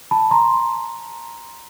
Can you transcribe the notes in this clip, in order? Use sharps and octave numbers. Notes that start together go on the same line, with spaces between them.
A5 B5
A#5 C6